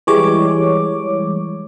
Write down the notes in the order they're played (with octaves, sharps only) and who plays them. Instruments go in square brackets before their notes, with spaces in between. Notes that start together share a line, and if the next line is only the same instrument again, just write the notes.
[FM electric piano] E3 G3 G#3 C#5 D6